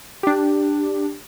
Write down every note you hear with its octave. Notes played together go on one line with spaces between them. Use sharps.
D4 G4